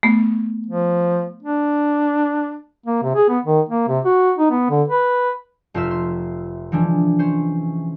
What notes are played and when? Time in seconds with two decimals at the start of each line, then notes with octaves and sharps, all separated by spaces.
0.03 A3 B3
0.66 F3
1.42 D4
2.86 A#3
3.02 C3
3.15 G#4
3.29 B3
3.45 D#3
3.69 A#3
3.88 C3
4.05 F#4
4.38 D#4
4.51 B3
4.70 D3
4.88 B4
5.74 F1 F4 C5 E5 F6
5.91 C6
6.72 E3 F3 G#3 D4
7.19 C#4 C5